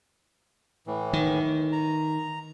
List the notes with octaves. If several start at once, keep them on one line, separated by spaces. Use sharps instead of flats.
A2 E3
D#3
A#5